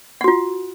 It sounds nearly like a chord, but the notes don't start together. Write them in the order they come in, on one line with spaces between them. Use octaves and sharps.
F#5 F#4 F4